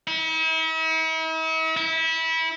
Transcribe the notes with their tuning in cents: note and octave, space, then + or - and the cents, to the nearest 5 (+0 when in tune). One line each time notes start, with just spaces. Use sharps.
E4 -45
E4 -25